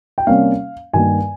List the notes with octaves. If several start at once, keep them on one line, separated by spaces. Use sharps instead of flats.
G5
C3 G3 A#3 C#4 F5
G2 D#3 A#3 G#5